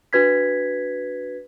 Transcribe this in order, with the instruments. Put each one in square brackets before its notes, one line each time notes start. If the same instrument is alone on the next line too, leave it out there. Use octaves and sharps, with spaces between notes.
[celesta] D4 F#4 B4 G#6 B6